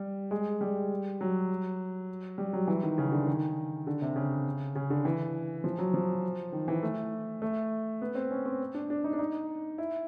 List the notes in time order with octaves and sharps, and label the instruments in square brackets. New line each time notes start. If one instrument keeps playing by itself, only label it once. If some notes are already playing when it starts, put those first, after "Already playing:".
Already playing: [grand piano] G3
G#3
G3
F#3
G3
F#3
E3
D#3
C#3
D3
D#3
D3
C3
C#3
C#3
D3
E3
F3
F#3
F3
D#3
E3
A3
A3
B3
C4
C#4
C4
D4
D4
D#4
D4
D#4
E4